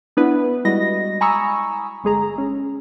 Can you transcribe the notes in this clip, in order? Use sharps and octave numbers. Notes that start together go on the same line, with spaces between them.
B3 D4 E4 B4
G3 G#3 E4 F#4 D#5 A#6
G#5 A#5 B5 C#6 D#6 E6
G1 G#3 G#4 A#5
C#4